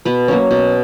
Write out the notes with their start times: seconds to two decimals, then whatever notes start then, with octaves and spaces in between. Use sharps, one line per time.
0.05 B2 B4
0.28 F#3 A#3 C#4
0.51 B2